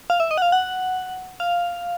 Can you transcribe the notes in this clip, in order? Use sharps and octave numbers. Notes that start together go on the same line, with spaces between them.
F5
E5
D#5
F#5
F5
F#5
F5